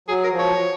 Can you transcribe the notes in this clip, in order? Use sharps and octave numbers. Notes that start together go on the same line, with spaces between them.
F#3 G#4
A#4
F3
C#5